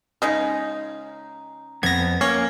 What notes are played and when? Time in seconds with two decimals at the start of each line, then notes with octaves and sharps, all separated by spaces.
0.22 C#3 G#3 D#4
1.83 F2 B3 G#6 A#6
2.21 A#3 C#4 C#5